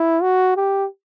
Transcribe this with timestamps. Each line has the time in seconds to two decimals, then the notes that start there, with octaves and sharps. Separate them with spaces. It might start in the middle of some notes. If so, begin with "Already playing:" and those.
Already playing: E4
0.22 F#4
0.56 G4